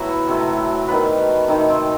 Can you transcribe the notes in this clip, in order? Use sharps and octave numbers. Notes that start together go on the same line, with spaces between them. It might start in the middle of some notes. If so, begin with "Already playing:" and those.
Already playing: A2 F#3 B3 E4 F#4
C3 F#3 A3
D#3 G3 B3 B4
C3 D#3 A3 D#4
D#4
C4